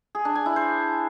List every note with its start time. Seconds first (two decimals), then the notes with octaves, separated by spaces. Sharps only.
0.15 G#4
0.25 D4
0.35 G#5
0.46 E4
0.56 C5